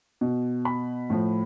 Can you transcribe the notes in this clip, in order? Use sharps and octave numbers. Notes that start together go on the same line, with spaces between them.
B2
B5
A2 F3